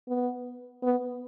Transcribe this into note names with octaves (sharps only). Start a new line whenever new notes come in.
B3
B3